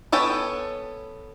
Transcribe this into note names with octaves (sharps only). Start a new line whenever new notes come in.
B3 A4 C#5 G5 G#5